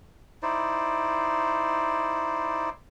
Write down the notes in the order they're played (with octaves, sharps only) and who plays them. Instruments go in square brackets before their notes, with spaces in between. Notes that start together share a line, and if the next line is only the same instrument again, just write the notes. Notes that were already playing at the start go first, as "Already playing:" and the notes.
[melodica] D#4 E4 C5 D5